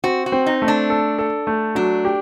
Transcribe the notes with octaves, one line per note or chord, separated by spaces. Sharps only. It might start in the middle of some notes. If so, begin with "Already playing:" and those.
C4 F#4
F#4
C4
D#4
A3
D4
A4
A4
A3
F#3 D4
G4